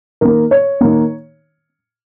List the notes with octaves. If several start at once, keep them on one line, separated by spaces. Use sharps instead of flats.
D#3 A#3 A#4
C#5
D#3 A#3